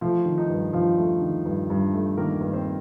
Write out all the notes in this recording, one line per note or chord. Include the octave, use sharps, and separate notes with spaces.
F3 A3 F4
D#3
D#4
G2
G2 F3 F4
A3
D#3
G2
G2
A3
D#3 A#3 A#4
G2
C4 C5